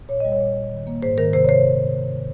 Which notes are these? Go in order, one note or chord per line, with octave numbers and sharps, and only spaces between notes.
A#2 C#5
G3 D#5
C#5
A#2
A#2
D#3
A#3
G#2 C5
D#3 A#4
C3 C5
C#5
C3 C5